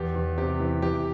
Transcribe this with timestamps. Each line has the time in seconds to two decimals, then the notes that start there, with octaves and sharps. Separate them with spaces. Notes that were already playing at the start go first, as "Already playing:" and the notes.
Already playing: E2 G4
0.15 E2
0.37 C3 G4
0.60 E3
0.82 E3 G4